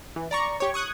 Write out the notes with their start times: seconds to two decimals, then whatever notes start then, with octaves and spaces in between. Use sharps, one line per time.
0.16 E3
0.31 D5 A#5 C#6
0.60 G4 C#5
0.74 C#6 D#6 F#6 G#6